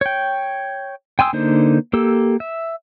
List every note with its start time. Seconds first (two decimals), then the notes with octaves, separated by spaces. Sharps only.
0.01 C#5 G5
1.19 G5 G#5 C6 D#6 E6
1.33 D3 A#3 D#4 C5
1.93 A#3 G4 A4 E6
2.40 E5